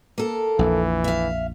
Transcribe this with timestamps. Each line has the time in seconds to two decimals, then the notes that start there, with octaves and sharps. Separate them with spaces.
0.18 A#3 A4
0.59 A#1 F2 E3
1.04 E5 F5